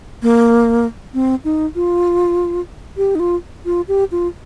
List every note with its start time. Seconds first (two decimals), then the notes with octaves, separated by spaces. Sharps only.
0.22 A#3
1.14 C4
1.44 D#4
1.75 F4
2.97 G4
3.15 D#4
3.19 F4
3.65 F4
3.88 G4
4.11 F4